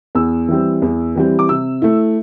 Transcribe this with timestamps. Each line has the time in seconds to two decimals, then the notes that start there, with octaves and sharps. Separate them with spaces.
0.15 E2 E6
0.48 E3 G3 C4
0.82 E2
1.16 E3 G3 C4
1.39 D6
1.49 C3 E6
1.82 A3 E4